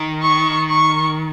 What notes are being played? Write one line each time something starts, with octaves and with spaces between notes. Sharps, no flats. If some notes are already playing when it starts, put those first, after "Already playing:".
Already playing: D#3
C#6
C#6